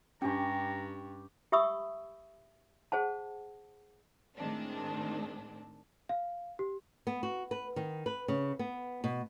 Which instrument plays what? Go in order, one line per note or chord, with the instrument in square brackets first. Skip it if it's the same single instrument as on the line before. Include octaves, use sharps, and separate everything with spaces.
[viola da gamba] G2 [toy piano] C#4 D4 [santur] G4 C#6 [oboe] A#5
[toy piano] G4 E5 B5 C#6 D#6 E6
G#4 C5 F#5 A5
[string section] A2 D#3 G#3 C4 D4
[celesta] F5
G4
[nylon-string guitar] B3
F#4
B4
D#3
B4
C#3
B3
B2